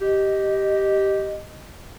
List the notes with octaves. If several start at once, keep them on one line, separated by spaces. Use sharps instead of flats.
G4 D#5